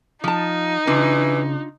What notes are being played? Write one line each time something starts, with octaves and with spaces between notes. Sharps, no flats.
F3 D#4 A5
C#3 E3 D4 F4